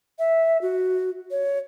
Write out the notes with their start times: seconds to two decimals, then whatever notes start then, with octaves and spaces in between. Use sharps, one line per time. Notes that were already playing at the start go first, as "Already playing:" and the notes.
0.19 E5
0.62 F#4
1.31 C#5